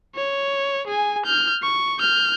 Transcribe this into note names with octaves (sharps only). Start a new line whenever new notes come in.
C#5
G#4 G#5
F6 G6
C#6
F6 G6